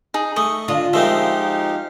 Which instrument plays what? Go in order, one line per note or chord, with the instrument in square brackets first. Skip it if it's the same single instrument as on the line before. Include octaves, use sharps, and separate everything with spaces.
[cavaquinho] D#4 G#4
[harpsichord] A3 [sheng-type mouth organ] C#6 [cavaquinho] D#6
[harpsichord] D3 [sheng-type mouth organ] D4 D#5 [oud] F4 [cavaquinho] D#6
[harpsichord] F3 G#3 C4 [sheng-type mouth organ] D#4 G4 F5 [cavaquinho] A#4 E5